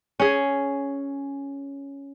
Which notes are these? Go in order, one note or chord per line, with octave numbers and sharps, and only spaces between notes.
C#4 G#4